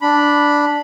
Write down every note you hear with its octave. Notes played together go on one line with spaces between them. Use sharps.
D4 B5